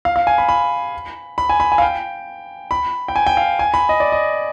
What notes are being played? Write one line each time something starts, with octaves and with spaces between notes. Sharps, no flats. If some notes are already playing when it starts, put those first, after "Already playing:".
F5
F5
G#5
B5
B5
B5
G#5
B5
G#5
F5
G5
B5
G5
G#5
G5
F5
G#5
B5
D#5
D5
D#5